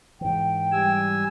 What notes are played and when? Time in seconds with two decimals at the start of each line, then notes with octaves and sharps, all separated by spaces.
0.21 G#2 E3 G5
0.72 G3 G#5 E6